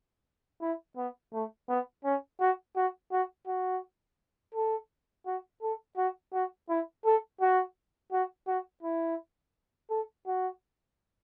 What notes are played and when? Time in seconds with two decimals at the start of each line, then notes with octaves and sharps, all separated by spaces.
0.61 E4
0.97 B3
1.33 A3
1.69 B3
2.04 C#4
2.40 F#4
2.76 F#4
3.12 F#4
3.47 F#4
4.54 A4
5.26 F#4
5.62 A4
5.97 F#4
6.33 F#4
6.69 E4
7.05 A4
7.41 F#4
8.12 F#4
8.48 F#4
8.83 E4
9.90 A4
10.27 F#4